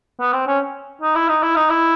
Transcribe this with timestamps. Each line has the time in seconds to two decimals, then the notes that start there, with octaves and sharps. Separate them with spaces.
0.20 B3
0.33 C4
0.47 C#4
1.01 D#4
1.15 E4
1.28 D#4
1.42 E4
1.56 D#4
1.69 E4